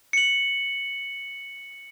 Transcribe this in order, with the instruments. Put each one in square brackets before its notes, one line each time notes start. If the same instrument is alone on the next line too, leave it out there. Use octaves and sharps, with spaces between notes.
[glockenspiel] C#7 F#7